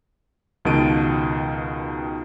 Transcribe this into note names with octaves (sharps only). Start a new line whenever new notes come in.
C#2 B2 D#3 A5 D7 D#7